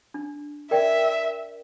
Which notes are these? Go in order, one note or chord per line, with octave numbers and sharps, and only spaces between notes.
D4
A#4 D5 E5 G5